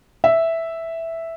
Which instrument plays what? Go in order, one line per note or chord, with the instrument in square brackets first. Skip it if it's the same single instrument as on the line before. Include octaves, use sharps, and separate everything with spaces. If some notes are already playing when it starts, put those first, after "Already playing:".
[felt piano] E5